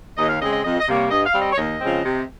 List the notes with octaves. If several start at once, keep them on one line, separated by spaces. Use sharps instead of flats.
D#2 D#5
F5
C#3 G#3 C4 D#5
D#5
F2 D#5
D#5
C3 G3 A#3
C#5
G2 D#5
F5
G3 C4
D#5
C#5
D#2 D#5
C#3 F3 G#3 C4
C3